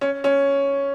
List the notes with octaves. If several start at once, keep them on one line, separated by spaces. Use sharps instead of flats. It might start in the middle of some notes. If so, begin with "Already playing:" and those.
C#4
C#4